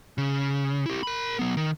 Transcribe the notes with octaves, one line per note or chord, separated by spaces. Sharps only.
C#3
E4 G4
A#4 B5
F#3 B3
D#3